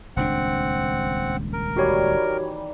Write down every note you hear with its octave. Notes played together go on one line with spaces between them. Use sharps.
D#1 C#2 C4 D4 F#5
A#4
D#3 E3 G3 F#4 G4 C#5